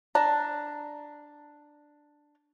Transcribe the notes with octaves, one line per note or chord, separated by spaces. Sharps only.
D4 A5 A#5